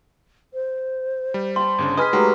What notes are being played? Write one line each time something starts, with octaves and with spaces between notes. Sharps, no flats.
C5
G3
G5 A5 C6
G1 C#3 D4
G#4 B4 D#5 G#5 D#6 F6 B6
F#3 G#3 A3 D#4 G4